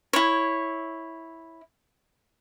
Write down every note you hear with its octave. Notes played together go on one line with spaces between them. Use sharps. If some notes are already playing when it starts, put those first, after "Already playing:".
E4 C#5